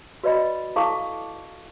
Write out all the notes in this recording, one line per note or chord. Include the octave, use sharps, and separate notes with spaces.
F#4 B4 D5 D#5 B5
E4 A4 F5 A5 C#6 D6